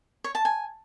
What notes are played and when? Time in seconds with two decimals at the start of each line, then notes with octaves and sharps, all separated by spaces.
0.24 C#5
0.35 A5
0.45 G#5